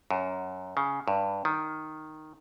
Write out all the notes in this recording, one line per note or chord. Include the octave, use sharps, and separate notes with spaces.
F#2
C#3
G2
D#3